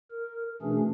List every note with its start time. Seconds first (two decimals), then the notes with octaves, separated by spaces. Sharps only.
0.11 A#4
0.62 B2 E3 A3 C#4 D4 G#4